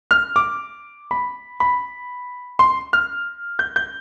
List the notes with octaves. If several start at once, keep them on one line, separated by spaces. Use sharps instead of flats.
F6
D6
B5
B5
C6
F6
G6
G6